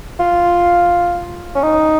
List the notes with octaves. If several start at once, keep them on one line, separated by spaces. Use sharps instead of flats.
F4
C#4
D#4